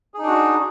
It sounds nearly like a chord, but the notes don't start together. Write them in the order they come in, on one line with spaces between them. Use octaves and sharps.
G#4 D#4 D4 F#4